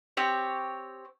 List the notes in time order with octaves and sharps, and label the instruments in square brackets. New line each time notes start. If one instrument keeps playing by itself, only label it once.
[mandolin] C4 G4 C#5